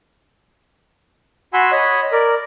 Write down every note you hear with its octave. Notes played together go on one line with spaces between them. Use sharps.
F#4 F#5 G#5 B5 C6 E6
C#5 D#5 B5
A#4 D5